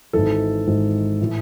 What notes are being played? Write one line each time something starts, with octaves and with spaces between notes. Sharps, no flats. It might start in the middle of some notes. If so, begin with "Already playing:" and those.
G#1 G#2 E3 A4
G#1 G#2 E3
A2 E3